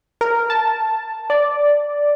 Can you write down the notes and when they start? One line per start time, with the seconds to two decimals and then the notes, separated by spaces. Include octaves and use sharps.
0.21 A#4
0.50 A5
1.30 D5